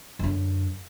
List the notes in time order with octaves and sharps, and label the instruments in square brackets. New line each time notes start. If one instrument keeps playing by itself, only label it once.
[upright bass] F#2 D3